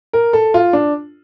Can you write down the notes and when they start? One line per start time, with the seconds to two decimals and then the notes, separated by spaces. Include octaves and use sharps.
0.13 A#4
0.33 A4
0.54 F4
0.73 D4